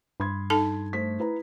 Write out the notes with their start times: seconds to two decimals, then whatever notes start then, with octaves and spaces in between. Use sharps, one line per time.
0.20 G2 B5 C6 G#6
0.50 D#4 A4 A5
0.93 A3 C5 B6
1.20 E4 B4 A#5